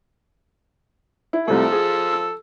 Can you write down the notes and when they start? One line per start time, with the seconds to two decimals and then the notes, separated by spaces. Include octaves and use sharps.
1.33 E4
1.48 C2 C3 F3 A3 A4
1.72 G#4
2.13 E6